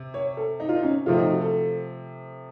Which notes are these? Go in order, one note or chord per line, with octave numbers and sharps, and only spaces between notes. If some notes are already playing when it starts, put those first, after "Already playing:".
Already playing: C3
C#5
A4
D#4
F4
D#4
C#4
C3 F3 A3 F4
D#4
F#4
A4